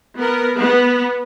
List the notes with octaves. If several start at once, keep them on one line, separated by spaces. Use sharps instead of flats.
B3 A#4
B3